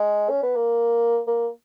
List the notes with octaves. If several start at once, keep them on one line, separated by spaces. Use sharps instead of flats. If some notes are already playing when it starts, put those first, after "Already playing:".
Already playing: G#3
C#4
B3
A#3
A#3